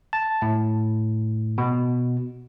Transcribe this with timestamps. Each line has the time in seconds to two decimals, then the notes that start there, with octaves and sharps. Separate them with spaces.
0.13 A5
0.42 A2
1.58 B2